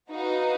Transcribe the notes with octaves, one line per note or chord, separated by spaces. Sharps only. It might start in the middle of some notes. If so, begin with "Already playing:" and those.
D#4 F#4 B4 F5